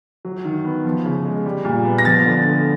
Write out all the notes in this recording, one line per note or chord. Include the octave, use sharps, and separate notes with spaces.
F#3
D#3
B3
F3
C#3
G#3
G3
A#2
B3
A#6
F3 A6
D3
A3